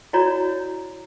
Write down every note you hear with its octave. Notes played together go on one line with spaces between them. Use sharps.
E4 F#4 C#5 D5 A#5